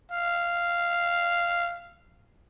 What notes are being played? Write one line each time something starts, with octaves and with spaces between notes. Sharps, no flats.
F5